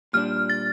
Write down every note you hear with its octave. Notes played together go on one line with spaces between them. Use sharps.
A#2 G3 D4 F6
A6